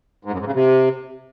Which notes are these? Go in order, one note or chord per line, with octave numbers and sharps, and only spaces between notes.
G#2
F#2
G#2
C#3
C3